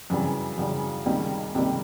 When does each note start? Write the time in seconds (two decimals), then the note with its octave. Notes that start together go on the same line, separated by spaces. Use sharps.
0.10 F#2 C#3 E3 G3
0.58 F#2 C#3 E3 G3
1.06 C#2 C3 D#3 G3 A#3
1.54 C#2 C3 D#3 G3 A#3